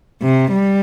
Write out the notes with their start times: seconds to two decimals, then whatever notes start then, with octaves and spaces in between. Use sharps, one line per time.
0.22 C3
0.52 G3